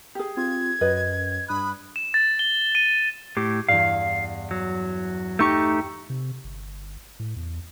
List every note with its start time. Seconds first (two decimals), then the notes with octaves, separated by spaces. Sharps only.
0.15 G4 G#4
0.37 C4 F4 G#6
0.81 F#2 B4 D#5
1.48 G2 B5 D#6 F#6
1.96 E7
2.14 A6
2.39 G7
2.75 D#7
3.37 A2 G4
3.69 E2 G2 F5
4.51 F#3
5.39 A3 D#4 G4 G5 C#6
6.10 C3
6.44 G1
7.20 A2
7.36 E2